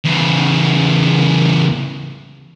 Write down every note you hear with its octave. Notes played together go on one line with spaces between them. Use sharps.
E2 C#3